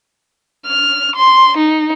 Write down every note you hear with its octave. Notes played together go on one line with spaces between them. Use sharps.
F6
C6
D#4